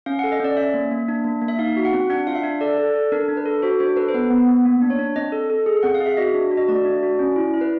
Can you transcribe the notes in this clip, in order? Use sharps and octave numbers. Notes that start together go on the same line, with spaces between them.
C#4 F5
A4 F#5
D#5
C#4 D5
C#4 E5
A#3
A#3
D4
A#3
A#3
E5
D#4 F5
F#4
F#5
C4
D4 F#5
F4 F5
E5
D4
A4 D5
A4
A4
D4 A#4
D4
B4
A4
F#4 C5
D4 C5
A4 B4
C5
B3 B4
B3
B3
A#3
D4
C#5
D4
C4 D#5
A4
A4
G#4
C4 F#5
F5
G#4
E5
F#4 D#5
D4
F#4
D#5
A3 D5
D4
F#4
C#4
E4
E4
B4